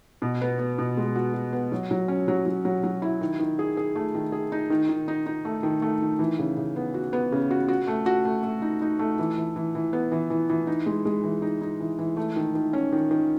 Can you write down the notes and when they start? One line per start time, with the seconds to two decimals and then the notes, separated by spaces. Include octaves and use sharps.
0.22 B2
0.41 B3
0.59 B3
0.78 B2
0.97 G#3
1.15 F#4
1.34 F#4
1.53 B3
1.72 F#3
1.91 F#3
2.08 C#4
2.28 F#3
2.46 F#3
2.65 F#3
2.84 F#3
3.02 E4
3.21 D#3
3.40 D#3
3.59 G#4
3.77 G#4
3.95 A3
4.15 D#3
4.32 G#4
4.52 D#4
4.70 D#3
4.89 D#3
5.08 D#4
5.26 D#4
5.45 A3
5.63 D#3
5.82 A3
6.02 D#3
6.19 E3
6.39 C#3
6.57 C#3
6.76 B3
6.94 F#4
7.13 B3
7.32 C#3
7.51 F#4
7.68 F#4
7.87 A3
8.06 F#4
8.25 A3
8.43 A3
8.62 D#4
8.82 D#4
8.99 A3
9.19 E3
9.38 E3
9.56 E3
9.75 E3
9.93 B3
10.12 E3
10.30 E3
10.50 E3
10.67 D#4
10.86 G#3
11.05 G#3
11.24 E3
11.42 D#4
11.62 D#4
11.80 E3
11.99 E3
12.17 A3
12.36 D#3
12.55 D#3
12.73 C#4
12.92 D#3
13.11 D#3